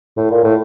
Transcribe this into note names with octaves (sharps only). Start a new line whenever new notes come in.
A2
A#2
A2